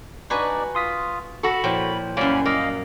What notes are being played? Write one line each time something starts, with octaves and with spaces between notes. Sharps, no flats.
D4 D#4 F#4 B4 D5 G#5
F4 C6 D#6 B6
F#4 A4 B5 C#6
A#2 F3 E4 C#5 G5
F#2 F#3 G3 A#3 G#5 B5
A#3 D#5 F5